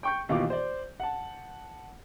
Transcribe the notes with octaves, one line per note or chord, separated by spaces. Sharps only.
G5 C#6 G6
D#2 B2 E3 F4 F5 D6
C5 D5
F#5 A5